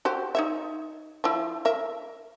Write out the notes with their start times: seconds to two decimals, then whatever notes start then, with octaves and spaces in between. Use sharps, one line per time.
0.05 F#4 G4 C5
0.35 D#4 C#5 E5
1.24 F3 E4
1.65 A#4 E5